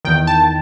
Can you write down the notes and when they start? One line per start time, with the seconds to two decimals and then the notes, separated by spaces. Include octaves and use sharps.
0.05 E2 D#3 G5
0.27 A5